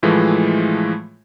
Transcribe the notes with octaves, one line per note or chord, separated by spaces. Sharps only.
A2 E3 F3 G#3 A3